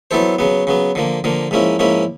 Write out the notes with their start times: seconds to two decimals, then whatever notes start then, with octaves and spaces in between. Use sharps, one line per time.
0.11 F#3 B3 E4 A4 C5
0.39 C#3 F#3 B3
0.67 C#3 F#3 B3
0.95 D3 F3 A#3
1.24 D3 F3 A#3
1.51 G#2 F3 A#3 C#4 E4
1.79 G#2 F3 A#3 C#4 E4